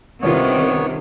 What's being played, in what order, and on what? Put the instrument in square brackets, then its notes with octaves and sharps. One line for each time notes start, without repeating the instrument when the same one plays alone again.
[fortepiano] C2 C#4 F4 [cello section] C3 D#3 [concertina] B3 C#5